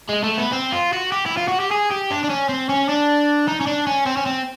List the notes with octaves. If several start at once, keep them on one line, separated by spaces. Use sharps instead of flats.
G#3
A3
B3
C4
F4
F#4
G4
E4
F4
F#4
G4
G#4
G4
D4
D4
C#4
C4
C#4
D4
D#4
C#4
D4
C#4
C4
C#4
C4